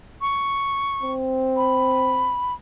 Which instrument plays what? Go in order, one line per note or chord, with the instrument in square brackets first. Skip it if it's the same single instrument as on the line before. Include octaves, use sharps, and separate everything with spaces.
[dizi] C#6
[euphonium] C4
[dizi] B5